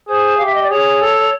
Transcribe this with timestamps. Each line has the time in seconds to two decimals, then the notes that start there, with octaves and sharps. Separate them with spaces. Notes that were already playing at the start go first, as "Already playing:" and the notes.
0.08 G#4 C5
0.37 G4 F5
0.45 E5
0.54 D#5
0.63 D5
0.70 G#4 C#5
1.02 A4